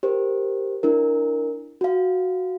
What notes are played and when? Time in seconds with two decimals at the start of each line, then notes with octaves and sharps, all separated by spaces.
0.03 G4 A#4 C5
0.83 D4 E4 A#4
1.81 F#4 F5